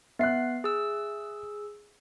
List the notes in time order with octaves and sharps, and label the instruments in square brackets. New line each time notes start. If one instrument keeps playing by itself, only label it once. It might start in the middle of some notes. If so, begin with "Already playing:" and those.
[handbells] B3 C7 [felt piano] E5 F#6
[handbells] G#4 E6